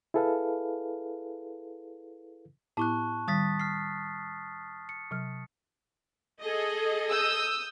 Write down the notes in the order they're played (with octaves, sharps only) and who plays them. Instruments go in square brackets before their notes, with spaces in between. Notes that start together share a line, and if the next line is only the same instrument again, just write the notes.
[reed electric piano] E4 G#4 A4 B4 F5
[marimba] A2 B3 E4 [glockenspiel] A5 C#6 F#6
[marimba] D#3 G3 [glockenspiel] D#6 A6 B6
[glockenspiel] F6 C7
C#7
[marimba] C3 F#3 F6
[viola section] G#4 A4 D#5
[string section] D#6 E6 G6